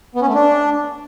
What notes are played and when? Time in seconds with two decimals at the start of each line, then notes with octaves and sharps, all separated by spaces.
0.15 B3
0.22 C#4
0.28 A3
0.34 D4